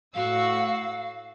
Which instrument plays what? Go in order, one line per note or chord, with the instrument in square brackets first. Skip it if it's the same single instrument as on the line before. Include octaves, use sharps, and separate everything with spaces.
[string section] A2 F#4 E6 [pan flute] F5